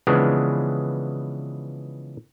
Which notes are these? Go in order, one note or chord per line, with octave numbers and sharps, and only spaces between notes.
C#3 E3 F3 G#3 B3 D4